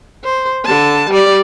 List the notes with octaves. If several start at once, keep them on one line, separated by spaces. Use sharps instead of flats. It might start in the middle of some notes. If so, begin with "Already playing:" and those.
C5
D3 A5
G3 D5